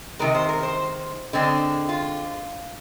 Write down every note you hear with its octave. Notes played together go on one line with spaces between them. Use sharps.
C3 D#3 G#3 A#4
C5
A#4
C5
D3 G#3 C4
F4